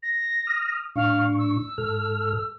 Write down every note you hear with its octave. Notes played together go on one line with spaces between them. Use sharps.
A#6
D#6 F6
A2 D4 F5 C#6
E6
G#2 A4 F6